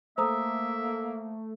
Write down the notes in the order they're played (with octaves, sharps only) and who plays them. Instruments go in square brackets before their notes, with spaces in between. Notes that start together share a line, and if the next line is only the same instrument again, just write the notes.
[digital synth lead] A3 [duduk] A#3 [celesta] C5 A#5 D#6 [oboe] E5